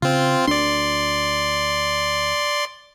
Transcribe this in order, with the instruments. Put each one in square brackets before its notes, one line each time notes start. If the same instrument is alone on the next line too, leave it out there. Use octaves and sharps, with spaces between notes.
[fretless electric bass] C#3 [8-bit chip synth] C4 F4
[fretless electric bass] D2 D4 [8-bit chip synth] D5 C6